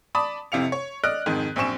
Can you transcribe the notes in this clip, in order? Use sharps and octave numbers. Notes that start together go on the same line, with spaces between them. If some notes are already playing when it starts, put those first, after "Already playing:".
D5 A5 B5 D6 D#6
F2 C3 E4 F5 C#7 F7
C#5
D5 D#5 F6 F#6 D7
F2 G#2 D#3
A#1 F#2 C4 G#5 C#6 E7